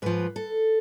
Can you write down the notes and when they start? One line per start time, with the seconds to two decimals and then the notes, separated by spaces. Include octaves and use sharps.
0.02 G#2 F3 B4
0.36 A4